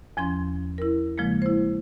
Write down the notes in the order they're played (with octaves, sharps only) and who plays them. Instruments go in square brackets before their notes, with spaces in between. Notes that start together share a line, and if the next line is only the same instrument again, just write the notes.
[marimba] E2 F3 C#4 C6
E4 A#4
C#3 F3 G#3 A#3
E4 C5